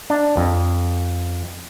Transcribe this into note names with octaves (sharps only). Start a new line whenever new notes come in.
D4
F2